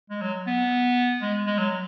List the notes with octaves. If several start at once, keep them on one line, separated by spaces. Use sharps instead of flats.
G#3
F#3
B3
G#3
G#3
F#3